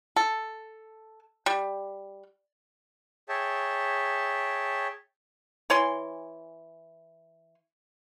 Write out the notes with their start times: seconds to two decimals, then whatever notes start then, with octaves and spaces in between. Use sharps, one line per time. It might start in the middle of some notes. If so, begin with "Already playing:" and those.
0.16 A4
1.46 G3
3.29 G#4 C#5 E5 G5 A5
5.70 E3 C#5 G#5 C6